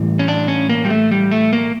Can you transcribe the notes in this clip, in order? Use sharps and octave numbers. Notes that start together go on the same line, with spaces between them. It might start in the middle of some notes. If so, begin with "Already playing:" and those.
Already playing: A2 E3 G3
C#4
D4
C#4
A#3
G3
A3
G3
A3
A#3